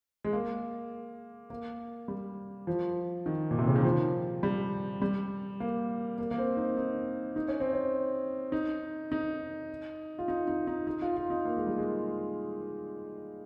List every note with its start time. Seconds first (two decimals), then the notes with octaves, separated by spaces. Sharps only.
0.25 G#3
0.33 A#3
1.50 A#3
2.08 G3
2.67 F3
3.26 D#3
3.51 A#2
3.59 C3
3.67 C#3
3.76 D#3
3.84 F3
4.43 G3
5.02 G3
5.60 A#3
6.18 A#3
6.31 A#3
6.38 C4
6.57 D#4
6.77 D#4
7.36 D#4
7.48 C#4
7.60 C4
7.73 C#4
8.52 D#4
9.12 D#4
10.19 F4
10.28 D#4
10.48 D#4
10.67 D#4
10.87 D#4
11.02 F4
11.17 F4
11.30 D#4
11.45 A#3
11.56 G#3
11.67 G3
11.78 G#3